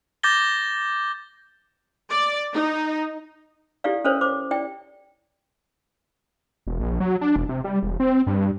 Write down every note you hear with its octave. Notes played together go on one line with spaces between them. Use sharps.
D6 G6 A6 A#6 G7
D5
D#4
E4 G4 A4 D5 F5
C#4 A4 A#4 C5 C#5
C5 D6
E4 D5 G5
E1
A#1
F#3
D4
E1
C3
G3
E1
C4
G2